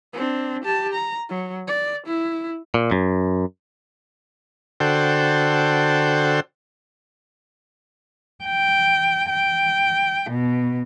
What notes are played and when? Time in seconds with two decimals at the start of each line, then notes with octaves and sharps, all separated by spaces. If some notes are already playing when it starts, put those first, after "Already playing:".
0.13 C4 D4
0.64 G4 A5
0.94 A#5
1.29 F#3
1.68 D5
2.07 E4
2.74 A#2
2.91 F#2
4.80 D3 F#4 A4 C5 G5
8.44 G5
9.29 G5
10.30 B2